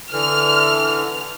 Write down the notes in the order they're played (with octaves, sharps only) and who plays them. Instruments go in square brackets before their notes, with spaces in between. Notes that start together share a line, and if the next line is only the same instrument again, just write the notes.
[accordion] D3 E3 [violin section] F6